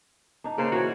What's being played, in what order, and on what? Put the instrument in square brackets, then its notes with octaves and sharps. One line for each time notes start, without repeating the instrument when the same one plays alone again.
[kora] D4 D#4
[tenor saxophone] C#3 [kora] A#3 C#4 C5
[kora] E3 C#5 [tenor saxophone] F#4